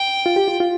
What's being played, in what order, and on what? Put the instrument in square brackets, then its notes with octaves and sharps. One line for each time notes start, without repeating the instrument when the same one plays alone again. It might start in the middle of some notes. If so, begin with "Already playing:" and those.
Already playing: [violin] G5
[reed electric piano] F4
G4
F4
F4